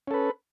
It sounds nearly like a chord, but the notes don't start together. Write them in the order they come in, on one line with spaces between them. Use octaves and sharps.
C#4 A4 B4